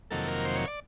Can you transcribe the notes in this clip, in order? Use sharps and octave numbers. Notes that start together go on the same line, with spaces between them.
F2 C3 D#3 F#3 A#3 A4
A#4
C5
C#5
D5